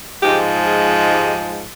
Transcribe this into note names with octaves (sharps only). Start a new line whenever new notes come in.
G#2 F3 G#3 D#4 G4
F4 G#4
G#4
D#4 G4